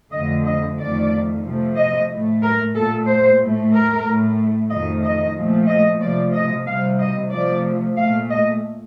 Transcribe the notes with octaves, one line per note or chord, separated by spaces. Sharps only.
F2 D3 A3 D#5
D#5
F2 D#3 A3 D5
C3 F3 A3
D#5
A2 A3
A#4
A#2 A3 A4
C5
A2 A3
A#4
A2 A3
F2 D#3 A3 D#5
D#5
A#2 F3 A3
D#5
C3 F3 A3 D5
D#5
C3 D#3 G3 F5
D#5
C3 F3 A3 D5
A#2 A3 F5
D#5